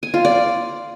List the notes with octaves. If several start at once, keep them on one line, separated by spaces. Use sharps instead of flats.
G#5
F4
D5